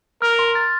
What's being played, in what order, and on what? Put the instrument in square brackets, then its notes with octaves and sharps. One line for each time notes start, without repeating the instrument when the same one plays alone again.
[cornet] A#4 [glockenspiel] F6
[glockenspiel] C6
A6